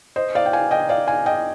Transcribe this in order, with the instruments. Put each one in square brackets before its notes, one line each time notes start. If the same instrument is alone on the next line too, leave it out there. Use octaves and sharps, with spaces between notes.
[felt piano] C5 D#5
D5 F5
G5
F5 G#5
D#5 G5
D5 F5
F5 G#5
D#5 G5